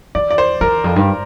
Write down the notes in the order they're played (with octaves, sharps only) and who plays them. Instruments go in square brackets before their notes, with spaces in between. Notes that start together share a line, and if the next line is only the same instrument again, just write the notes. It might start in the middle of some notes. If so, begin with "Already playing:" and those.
[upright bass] E2 [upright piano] D5
[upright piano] D5
C5
[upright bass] E2 [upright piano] A#4
[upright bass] F2
G2